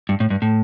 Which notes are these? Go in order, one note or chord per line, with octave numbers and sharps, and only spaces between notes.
G2
A2
G2
A2